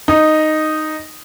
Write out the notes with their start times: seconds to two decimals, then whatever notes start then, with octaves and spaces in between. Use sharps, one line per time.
0.08 D#4